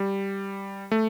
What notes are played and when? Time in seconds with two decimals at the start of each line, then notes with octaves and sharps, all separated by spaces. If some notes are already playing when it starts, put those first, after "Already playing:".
Already playing: G3
0.91 A3